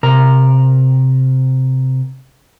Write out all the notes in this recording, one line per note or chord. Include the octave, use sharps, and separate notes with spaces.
C3 A#4 A#5